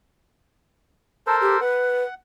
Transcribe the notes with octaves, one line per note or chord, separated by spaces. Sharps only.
A4 A#4 C5 A5
G4
B4 F#5